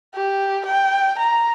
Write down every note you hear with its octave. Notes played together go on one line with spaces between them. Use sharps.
G4
G5
A#5